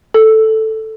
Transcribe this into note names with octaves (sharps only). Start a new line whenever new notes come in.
A4